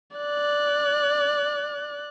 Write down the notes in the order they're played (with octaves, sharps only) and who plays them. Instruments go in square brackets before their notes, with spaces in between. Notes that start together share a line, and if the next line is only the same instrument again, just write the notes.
[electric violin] D5 F#6